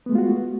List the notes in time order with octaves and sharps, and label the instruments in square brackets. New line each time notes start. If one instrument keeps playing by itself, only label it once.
[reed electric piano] B3
A3
G#3
F4
F#4